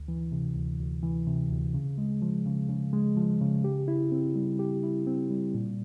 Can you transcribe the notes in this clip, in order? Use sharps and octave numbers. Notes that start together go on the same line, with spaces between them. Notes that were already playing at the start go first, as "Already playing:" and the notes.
Already playing: D2
E3
C3
D2
D2
E3
C3
D2
C#3
G#3
F3
C#3
C#3
G#3
F3
C#3
G4
E4
C4
G3
G4
E4
C4
G3
A#2